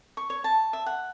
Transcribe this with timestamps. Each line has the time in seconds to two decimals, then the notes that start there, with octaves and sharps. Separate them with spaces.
0.17 C#6
0.30 C#5
0.44 A5
0.73 E5
0.86 F#5